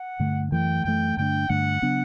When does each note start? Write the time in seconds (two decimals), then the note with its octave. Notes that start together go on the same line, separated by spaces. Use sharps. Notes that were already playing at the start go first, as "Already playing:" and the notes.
Already playing: F#5
0.19 G2 D3 A3
0.52 F#2 E3 A3 G5
0.85 F#2 E3 A3 G5
1.17 G2 D3 A3 D4 G5
1.49 G2 D3 A3 D4 F#5
1.82 C#3 F#3 B3 D4